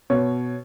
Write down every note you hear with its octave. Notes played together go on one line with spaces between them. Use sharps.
B2 C#5